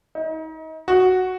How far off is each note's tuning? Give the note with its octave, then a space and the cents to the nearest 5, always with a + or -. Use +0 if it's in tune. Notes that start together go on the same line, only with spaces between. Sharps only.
D#4 +35
F#4 +0